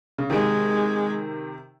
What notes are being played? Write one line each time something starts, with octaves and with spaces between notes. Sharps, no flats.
C#3
C3 D#3 G#3